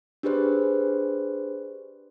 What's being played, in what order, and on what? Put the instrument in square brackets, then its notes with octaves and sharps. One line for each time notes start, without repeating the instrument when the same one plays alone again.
[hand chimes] D4 G4 G#4 B4 C5